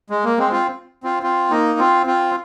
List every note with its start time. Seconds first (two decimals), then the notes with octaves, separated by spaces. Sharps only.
0.10 G#3
0.24 A#3
0.38 G#3 C4
0.52 C4 F4
1.03 C4 F4
1.23 C4 F4
1.50 A#3 D#4
1.79 C4 F4
2.06 C4 F4